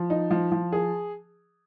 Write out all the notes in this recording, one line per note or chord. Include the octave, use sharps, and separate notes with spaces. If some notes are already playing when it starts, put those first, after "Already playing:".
Already playing: F3
D#4
F3
F3
G#4